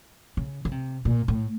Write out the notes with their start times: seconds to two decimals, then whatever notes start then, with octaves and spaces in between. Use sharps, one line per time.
0.37 C#3
0.65 C#3
0.71 C3
1.05 A#2
1.28 A2